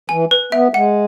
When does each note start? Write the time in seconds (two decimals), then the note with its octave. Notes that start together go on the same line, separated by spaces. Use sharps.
0.09 E3 G#5
0.31 B4
0.52 B3 E5
0.74 G#3 F#5